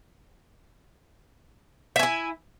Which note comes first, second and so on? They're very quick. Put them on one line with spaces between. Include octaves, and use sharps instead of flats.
E5 G#5 E4